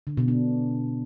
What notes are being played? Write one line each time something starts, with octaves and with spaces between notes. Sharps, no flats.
D3
B2
D4